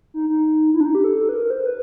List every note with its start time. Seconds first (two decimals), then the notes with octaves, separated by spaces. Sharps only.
0.14 D#4
0.29 D#4
0.74 E4
0.80 D4
0.85 D#4
0.95 G4
1.04 A4
1.29 B4
1.35 A#4
1.50 C5
1.66 B4